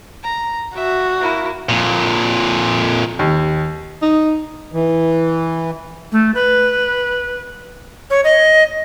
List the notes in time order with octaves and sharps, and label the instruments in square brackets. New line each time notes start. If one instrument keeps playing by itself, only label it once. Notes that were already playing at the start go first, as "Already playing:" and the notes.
[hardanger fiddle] A#5
[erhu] F#4 [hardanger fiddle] E5
[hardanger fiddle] A#3 E4
[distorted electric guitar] F2 A#2
[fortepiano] D#2
[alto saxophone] D#4
[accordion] E3
[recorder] A3
B4
C#5
D#5